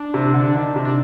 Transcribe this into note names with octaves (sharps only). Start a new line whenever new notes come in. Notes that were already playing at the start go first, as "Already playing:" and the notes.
Already playing: D4
C3
D3
D#3
C3
D4